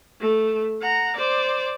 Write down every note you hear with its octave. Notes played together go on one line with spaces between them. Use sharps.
A3
F#5 A#5
C5 D5